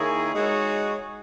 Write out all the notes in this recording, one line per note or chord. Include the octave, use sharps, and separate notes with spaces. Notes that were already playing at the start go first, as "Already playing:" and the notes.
Already playing: D#3 A#3 E4 G#4 C#5
G#3 D#4 F#4 C#5